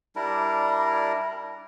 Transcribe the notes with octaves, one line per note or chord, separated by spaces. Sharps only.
G3 D4 E4 A#4